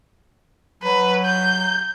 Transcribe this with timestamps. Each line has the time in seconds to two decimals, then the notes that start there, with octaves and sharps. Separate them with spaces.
0.83 F#3 B4
1.25 G6